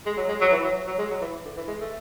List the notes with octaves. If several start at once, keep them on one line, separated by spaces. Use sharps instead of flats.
G#3
F#3
G#3
F#3
E3
F#3
F#3
G#3
F#3
E3
D3
E3
G#3
A3